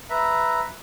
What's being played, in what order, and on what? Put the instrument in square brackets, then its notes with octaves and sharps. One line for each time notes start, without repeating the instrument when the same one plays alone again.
[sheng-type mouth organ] B4 E5 A#5